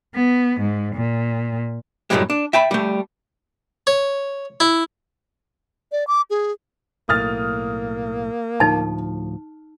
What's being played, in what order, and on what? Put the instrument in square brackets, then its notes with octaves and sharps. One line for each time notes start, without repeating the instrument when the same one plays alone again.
[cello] B3
G#2
A#2
[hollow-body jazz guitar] F#2 A2 D3 E3 G3 G#3
D4
E5 G5 A5 B5
G3 A3
[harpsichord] C#5
E4
[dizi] D5
D6
G#4
[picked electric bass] B1 A2 [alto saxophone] A#3 [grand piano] D#6 F6 A6
[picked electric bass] D2 A2 F3 [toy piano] D#4 A5